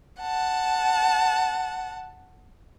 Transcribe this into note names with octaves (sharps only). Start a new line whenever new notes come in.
F#5 A5